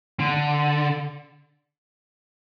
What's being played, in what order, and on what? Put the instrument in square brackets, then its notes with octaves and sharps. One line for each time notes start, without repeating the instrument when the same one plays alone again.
[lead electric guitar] D3